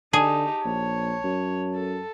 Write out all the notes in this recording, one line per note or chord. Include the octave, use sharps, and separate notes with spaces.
D3 D#4 G4 G#4 A5
A#1 C#5
F#2
A4